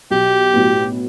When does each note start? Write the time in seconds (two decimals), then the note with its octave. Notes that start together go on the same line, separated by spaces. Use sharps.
0.11 B1 G4
0.53 A2 F#3 B3